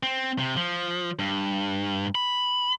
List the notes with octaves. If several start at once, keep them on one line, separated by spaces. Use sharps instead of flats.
C4
C3
F3
G2
B5